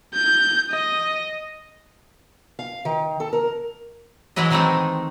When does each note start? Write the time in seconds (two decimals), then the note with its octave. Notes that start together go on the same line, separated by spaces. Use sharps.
0.14 G6
0.71 D#5
2.59 F5
2.85 D#3
3.20 A4
3.33 A#4
4.36 E3 F#3 G#3 E4 D#5
4.51 D#3 E3 G#3 A3 C4 D#4